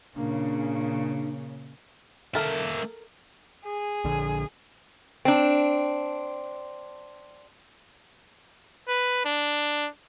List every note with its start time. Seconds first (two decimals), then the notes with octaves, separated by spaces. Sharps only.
0.16 A#2 C#3 A#3 D4
2.35 A#3 A4 A#4 E5
3.65 G#4
4.04 A#1 D3
5.25 C4 D4
8.88 B4
9.25 D4